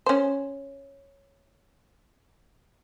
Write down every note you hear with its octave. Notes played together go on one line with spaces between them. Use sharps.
C#4 C5